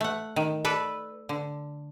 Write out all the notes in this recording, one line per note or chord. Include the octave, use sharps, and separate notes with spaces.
A3 F#5
D#3
A4 B4 D5
D3